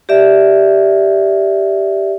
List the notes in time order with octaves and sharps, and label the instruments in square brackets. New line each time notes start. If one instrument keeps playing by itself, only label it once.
[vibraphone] G4 D5 E5